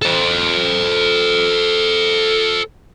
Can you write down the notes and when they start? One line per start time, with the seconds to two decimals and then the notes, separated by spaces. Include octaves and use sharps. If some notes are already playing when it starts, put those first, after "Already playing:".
0.02 A4 C5